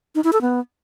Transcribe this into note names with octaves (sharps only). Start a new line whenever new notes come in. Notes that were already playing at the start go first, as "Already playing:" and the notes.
D#4
E4
A4
B3